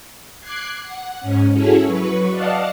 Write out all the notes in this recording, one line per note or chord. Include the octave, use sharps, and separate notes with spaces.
D6 F#6 G#6 C7
F#5
G#2 C#4
C#4 E4 F#4 G#4 A4 C#5
F#3 B4 C#6
D5 D#5 F5 F#5 A5